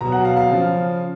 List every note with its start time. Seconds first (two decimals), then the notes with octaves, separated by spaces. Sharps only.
0.01 B2 F#3 A#5
0.12 F#5
0.25 F5
0.37 F5
0.50 C#3 F3